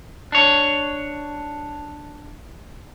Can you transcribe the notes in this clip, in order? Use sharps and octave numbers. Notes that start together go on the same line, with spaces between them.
D4 C#5